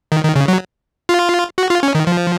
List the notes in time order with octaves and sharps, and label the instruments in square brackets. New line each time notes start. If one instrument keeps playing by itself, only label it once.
[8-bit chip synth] D#3
D#3
C#3
F#3
F4
F#4
F4
C#4
D#3
F3